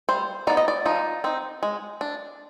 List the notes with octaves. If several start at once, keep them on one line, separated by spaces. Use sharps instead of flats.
G3 C5
B3 D#4 D5
D#5
D5
F3 D#4
C4 D#4
G#3
D4